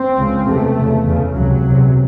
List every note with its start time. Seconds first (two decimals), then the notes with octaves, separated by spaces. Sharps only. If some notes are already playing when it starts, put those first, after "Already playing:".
Already playing: C4
0.18 C#2 C#3
0.48 E2 C3 A3
0.77 E2 C#3
1.07 E2 C#3
1.36 C#2 C3 F#3
1.65 E2 C3